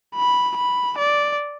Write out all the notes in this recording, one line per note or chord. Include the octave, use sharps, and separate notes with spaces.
B5
B5
D5